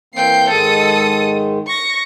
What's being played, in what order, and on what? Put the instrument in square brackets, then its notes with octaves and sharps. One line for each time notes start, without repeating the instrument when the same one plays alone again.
[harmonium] E3 A#3 C4 [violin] G5 C7
[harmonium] G#2 D#3 G#3 [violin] A4 D#6
[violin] C#6 A#6